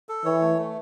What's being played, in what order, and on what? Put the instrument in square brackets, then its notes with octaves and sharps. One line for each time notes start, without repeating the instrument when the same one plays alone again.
[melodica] A4
[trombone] E3 [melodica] C#5
[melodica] A3
A3